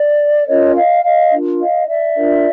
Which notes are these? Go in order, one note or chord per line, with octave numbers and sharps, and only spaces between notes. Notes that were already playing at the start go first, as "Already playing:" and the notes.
Already playing: D5
C#4 F4 A#4 C#5 D#5
D#5 F5
D#5 F5
D4 F4 A#4
D#5 F5
D5 E5
D4 F4 A#4